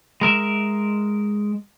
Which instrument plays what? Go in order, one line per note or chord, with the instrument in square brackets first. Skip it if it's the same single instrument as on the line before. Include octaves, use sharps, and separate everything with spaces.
[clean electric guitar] G#3 A#4 E5